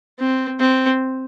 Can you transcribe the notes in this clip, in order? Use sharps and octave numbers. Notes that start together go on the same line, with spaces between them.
C4
C4